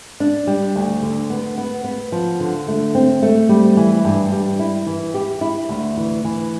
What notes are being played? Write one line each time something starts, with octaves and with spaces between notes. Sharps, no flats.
D4
G3
D2
D3
B3
B3
B3
F3
D3
A3
C4
A3
G3
E3
G2
G3
E4
E3
G4
E4
D2
E3
E3